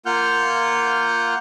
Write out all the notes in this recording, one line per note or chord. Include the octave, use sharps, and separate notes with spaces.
A#3 F4 F#5 F6 G6